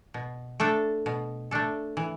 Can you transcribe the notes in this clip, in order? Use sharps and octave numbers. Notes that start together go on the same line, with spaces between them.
B2
A3 D4 A4
B2
A3 D4 A4
E3